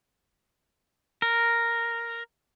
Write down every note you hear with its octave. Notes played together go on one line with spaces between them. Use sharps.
A#4